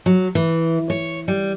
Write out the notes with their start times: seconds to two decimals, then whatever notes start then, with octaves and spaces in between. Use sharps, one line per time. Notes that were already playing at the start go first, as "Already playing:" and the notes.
0.06 F#3
0.35 E3
0.90 C#5
1.28 G3